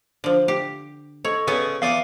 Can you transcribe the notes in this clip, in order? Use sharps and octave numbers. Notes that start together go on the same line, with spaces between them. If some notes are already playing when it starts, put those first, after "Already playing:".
D3 F3
G4
A4 C#5 D#5 C#6
C#3 B3 G#5
E2 D5 F5 D#6